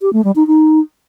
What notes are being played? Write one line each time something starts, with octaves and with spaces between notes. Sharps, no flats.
G4
A3
G3
D#4
D#4